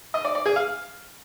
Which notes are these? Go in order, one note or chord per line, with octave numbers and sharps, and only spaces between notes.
D#5
D5
D5
G#4
F5